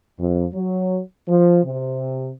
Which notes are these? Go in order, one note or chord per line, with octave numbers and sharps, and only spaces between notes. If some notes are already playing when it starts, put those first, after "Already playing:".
F2
F#3
F3
C3